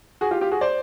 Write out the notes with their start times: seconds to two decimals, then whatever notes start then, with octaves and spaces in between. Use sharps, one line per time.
0.21 F#4 G#4
0.31 F4 G4
0.41 F4 G4
0.51 F#4 G#4
0.61 C5 D5